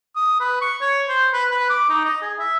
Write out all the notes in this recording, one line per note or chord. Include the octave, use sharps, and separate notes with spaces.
D#6
B4
C#6
C#5
C5
B4
B4
D6
D#4
D#5
G#4
E5